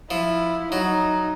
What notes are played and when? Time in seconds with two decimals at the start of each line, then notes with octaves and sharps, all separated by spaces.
0.11 F3 E4
0.72 F#3 D#4